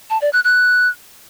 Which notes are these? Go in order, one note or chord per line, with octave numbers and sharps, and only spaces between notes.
A5
D5
F#6
F#6